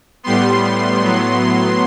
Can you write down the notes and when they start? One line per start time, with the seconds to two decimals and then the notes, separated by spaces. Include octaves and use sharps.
0.23 A2 G3 B3 C6
1.02 A2 F#3 B3